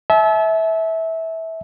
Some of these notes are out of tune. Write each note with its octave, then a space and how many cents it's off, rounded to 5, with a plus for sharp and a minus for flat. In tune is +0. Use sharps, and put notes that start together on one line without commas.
E5 -20 A5 -40